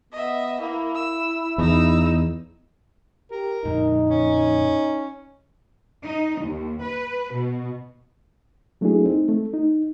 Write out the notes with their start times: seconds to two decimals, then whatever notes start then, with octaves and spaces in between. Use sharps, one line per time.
0.12 B3 D#5 E5
0.61 A#3 E4
0.95 E6
1.58 E2 D#4 E6
3.31 G4 A#4
3.65 F2 A#2 G#3 D#4
4.09 C#4
6.04 D#4
6.40 D#2
6.82 B4
7.33 B2
8.81 F#3 A3 A#3 D4 E4 G#4
9.05 C4 D#4
9.28 A3
9.54 D#4